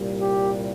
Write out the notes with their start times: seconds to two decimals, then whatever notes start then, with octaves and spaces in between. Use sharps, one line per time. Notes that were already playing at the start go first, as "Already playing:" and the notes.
Already playing: C2 A#2 G3
0.20 G4